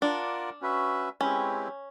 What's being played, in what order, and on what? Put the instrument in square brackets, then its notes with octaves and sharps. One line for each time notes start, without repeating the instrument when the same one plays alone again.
[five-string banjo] D4 [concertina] F4 A#4 D5 F#5
[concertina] C#4 F#4 B4 E5
[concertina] G#3 C4 E4 G4 B4 [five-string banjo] C#4